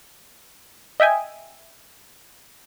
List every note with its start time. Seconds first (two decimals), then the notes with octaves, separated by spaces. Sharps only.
1.00 D#5 E5 G5 G#5